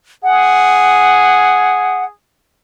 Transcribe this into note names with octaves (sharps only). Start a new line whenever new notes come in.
G#4 F#5